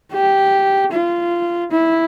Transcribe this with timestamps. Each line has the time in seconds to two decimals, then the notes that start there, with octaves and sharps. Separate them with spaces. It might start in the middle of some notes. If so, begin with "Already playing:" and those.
0.12 G4
0.92 F4
1.71 E4